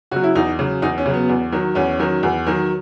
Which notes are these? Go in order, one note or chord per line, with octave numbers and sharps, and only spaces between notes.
C#3 F#3 F#4
E4
E2 D#4
C#3 F#3
E2 D#4
C#4
C#3 F#3
B3
E2
D#3 F#3
E2 C#4
D#3 F#3
E2
D#3 F#3